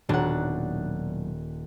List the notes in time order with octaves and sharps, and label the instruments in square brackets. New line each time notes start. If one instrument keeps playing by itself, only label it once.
[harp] D#1 F#5 [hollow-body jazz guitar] B1 F#3 D4